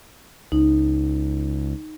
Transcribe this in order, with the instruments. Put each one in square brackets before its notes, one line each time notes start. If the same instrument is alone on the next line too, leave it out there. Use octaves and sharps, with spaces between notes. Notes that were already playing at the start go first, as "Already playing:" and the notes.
[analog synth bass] C#2 [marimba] D#4